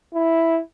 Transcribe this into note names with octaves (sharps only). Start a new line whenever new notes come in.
E4